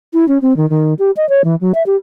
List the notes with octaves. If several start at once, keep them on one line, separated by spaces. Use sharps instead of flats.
E4
C#4
C4
D#3
D#3
G4
D#5
C#5
E3
F#3
E5
G4